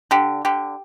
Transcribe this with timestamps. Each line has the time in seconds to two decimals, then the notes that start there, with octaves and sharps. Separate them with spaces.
0.11 D3 G4
0.45 D3 G4